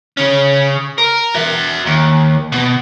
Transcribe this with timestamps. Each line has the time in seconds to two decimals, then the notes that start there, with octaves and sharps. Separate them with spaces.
0.17 C#3 C#4
0.98 A#4
1.35 F#4 E5
1.86 D#2
2.52 B2